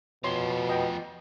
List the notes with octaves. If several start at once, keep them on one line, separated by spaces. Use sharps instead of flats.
B2 F3 G4 C#5 C6
D#5 G5